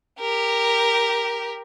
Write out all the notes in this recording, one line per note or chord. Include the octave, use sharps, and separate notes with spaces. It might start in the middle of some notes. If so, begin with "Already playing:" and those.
G4 A#4